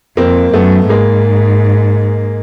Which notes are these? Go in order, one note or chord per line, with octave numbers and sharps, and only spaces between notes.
F2 A#3 C4
F#2 A3 B3
G#2 G#3 A#3